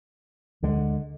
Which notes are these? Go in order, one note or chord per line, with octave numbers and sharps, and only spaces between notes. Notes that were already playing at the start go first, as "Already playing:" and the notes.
D2 D3 G#3